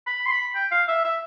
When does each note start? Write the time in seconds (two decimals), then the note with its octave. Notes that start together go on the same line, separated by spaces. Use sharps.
0.07 B5
0.26 C6
0.31 B5
0.55 G5
0.72 F5
0.88 E5
1.04 E5